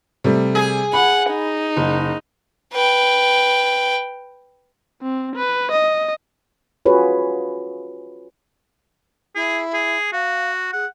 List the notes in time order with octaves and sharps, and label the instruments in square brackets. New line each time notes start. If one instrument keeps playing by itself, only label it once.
[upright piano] C3 G3 A3
[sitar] G#4
[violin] F#5 [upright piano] B5
[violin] D#4
[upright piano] F#1
[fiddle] B4 G5
[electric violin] C4
B4
D#5
[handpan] C#4 F4 F#4 G#4 B4 C#5
[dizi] E4 [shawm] G#4
[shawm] G#4
[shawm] F#4 [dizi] F5
[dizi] G#4 [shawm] F#5